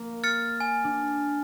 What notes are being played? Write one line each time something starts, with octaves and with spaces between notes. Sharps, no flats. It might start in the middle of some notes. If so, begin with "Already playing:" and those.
Already playing: A#3
F6 A6 C#7
G#5
D4